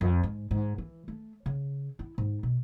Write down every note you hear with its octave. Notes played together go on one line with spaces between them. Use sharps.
F2
G#2
G#2
E3
A3
C#3
E4
G#2
B2